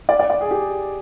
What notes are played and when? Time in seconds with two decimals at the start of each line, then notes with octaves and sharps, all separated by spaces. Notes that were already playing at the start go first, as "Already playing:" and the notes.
0.09 D5
0.19 D5
0.30 D5
0.41 G#4
0.51 G4